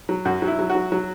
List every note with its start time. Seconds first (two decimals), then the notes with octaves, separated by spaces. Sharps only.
0.09 F#3
0.25 F#2 F#4
0.42 F#3
0.48 E4
0.59 F#3
0.70 F#4
0.75 F#3
0.92 F#3